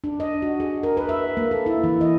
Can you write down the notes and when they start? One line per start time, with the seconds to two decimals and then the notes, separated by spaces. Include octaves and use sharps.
0.04 D4
0.20 D#5
0.42 F#4
0.60 G#4
0.83 A#4
0.97 B4
1.09 E5
1.37 A#3
1.51 A4
1.66 E4
1.84 E3
2.01 D#5